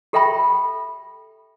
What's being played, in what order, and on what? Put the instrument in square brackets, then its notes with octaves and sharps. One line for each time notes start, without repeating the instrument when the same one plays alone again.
[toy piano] G4 A4 E5 G5 B5